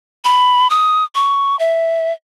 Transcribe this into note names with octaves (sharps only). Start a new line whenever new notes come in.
B5
D#6
C#6
E5